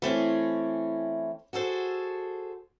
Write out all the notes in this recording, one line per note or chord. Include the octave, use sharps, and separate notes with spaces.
E3 A3 C4 C#4
F#4 G#4 A4 C5